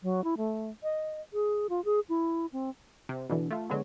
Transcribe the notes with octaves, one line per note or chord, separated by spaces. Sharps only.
F#3
E4
A3
D#5
G#4
F4
G#4
E4
C4
C3
B2 D3 E3
A3 F4
D3 F#3 G#3 B3